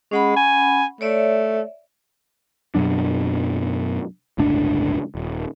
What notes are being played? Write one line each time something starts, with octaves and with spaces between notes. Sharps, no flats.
G#3 C#4 F#5 B5
G#5
A3 C#5 D5 E5
F#2 B2 F#3 D4
G1 C#2 A2 D4
D#1